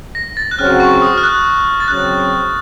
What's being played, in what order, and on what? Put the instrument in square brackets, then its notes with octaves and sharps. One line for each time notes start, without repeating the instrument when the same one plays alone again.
[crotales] A#6
A6
F#6
[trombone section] C#3 F#3 C4 F#4 [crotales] F6
[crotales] C#6
D#6
F6
F#6
A6
[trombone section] C#3 F#3 C4 [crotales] F#6